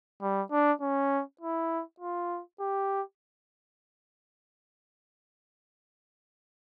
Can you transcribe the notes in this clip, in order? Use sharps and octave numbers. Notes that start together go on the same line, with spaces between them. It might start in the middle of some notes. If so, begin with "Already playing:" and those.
G3
D4
C#4
E4
F4
G4